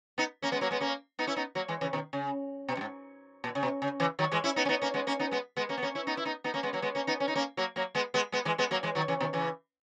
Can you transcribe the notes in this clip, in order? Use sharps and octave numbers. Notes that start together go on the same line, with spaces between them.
B3 D#4
A#3 C#4
G#3 B3
F#3 A#3
G#3 B3
A#3 C#4
B3 D#4
C#4 E4
B3 D#4
F#3 A#3
E3 G#3
C#3 E3
B2 D#3
C#3
B2
F#2
G#2
A#2
C#3
B2
C#3
C#3 E3
D#3 F#3
E3 G#3
C#4 E4
B3 D#4
C#4
B3 D#4
A#3 C#4
G#3 B3
A#3 C#4
B3 D#4
G#3 B3
G#3 B3
A#3 C#4
B3
A#3 C#4
C#4 E4
B3 D#4
E4
B3 D#4
B3 D#4
A#3 C#4
G#3 B3
F#3 A#3
G#3 B3
A#3 C#4
B3 D#4
C#4
D#4
A#3 C#4
F#3 A#3
F#3 A#3
G#3 B3
G#3 B3
G#3 B3
E3 G#3
G#3 B3
F#3 A#3
E3 G#3
D#3 F#3
C#3 E3
B2 D#3
C#3 E3